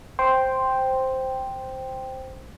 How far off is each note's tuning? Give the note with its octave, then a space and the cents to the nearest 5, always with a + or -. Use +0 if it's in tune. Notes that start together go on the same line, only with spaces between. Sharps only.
C5 +0 G5 +0